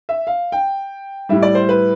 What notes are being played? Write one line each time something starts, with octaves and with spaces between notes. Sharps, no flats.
E5
F5
G5
A2 G3 E5
D5
C5
B4